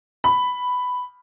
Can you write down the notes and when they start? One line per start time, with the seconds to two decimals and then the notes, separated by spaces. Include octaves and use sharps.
0.24 B5